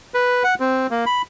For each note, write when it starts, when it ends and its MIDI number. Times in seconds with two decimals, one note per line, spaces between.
0.14 0.43 71
0.44 0.55 78
0.60 0.87 60
0.91 1.05 58
1.06 1.22 83